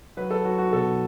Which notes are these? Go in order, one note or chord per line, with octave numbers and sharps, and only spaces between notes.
F#3 B4
A4
F#3 F#4
F#4
B2 A4